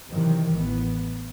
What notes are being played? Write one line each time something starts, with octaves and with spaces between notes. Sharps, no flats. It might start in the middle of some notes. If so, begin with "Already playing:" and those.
C3 D#3 E3 F#3
A1 B3